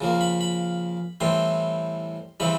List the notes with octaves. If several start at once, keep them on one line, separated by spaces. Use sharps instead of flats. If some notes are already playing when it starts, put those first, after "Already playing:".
C#3 F3 A#3
B5
B5
A2 E3 G3 C4 C6
C#3 E3 G3 C4 B5